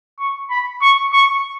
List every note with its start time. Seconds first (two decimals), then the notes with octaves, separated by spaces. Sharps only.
0.20 C#6
0.50 B5
0.82 C#6
1.13 C#6